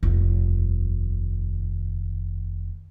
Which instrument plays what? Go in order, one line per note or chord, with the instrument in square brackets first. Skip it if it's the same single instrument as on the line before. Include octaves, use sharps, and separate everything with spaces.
[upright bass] F1 D#2